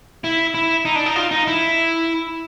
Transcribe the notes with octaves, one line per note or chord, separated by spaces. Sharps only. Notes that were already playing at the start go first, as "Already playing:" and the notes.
E4
E4
D#4
D4
D#4
F4
D#4
E4